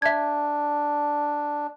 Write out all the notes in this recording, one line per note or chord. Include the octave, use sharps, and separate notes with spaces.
D4 E5 G#6